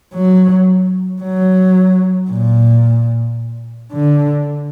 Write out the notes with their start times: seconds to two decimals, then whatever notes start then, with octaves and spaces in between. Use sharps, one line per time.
0.14 F#3
1.22 F#3
2.30 A#2
3.92 D3